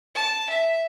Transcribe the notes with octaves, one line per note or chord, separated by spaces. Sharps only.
A5
E5